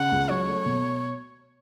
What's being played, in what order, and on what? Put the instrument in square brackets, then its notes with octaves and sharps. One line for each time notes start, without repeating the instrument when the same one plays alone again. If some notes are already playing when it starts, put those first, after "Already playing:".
Already playing: [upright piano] C#3 [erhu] F#5
[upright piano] C#2
[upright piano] F#3 [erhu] C#5
[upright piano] A3
B2